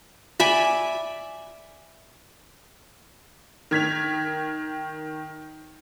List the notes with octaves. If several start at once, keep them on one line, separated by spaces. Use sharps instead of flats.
D5 E5 G#5 B5
D#3 G#6 B6 F7